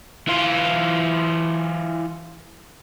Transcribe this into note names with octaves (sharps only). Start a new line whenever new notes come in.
E3 F4